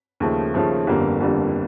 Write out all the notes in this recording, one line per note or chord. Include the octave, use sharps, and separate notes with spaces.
D#2 C#3 F3 A3
D#2 C#3 F3 A3
G1 F2 D3 G3 A#3
G1 F2 D3 G3 A#3